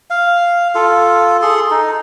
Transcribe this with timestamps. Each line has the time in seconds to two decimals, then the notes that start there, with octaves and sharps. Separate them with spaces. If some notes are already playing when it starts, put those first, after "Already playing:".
0.10 F5
0.75 F4 A4
1.42 G#4 A4 C6
1.71 D#4